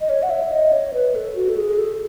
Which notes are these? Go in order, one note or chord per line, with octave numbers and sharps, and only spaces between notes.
D#5
C#5
F#5
E5
D#5
C#5
B4
A4
F#4
A4
G#4
A4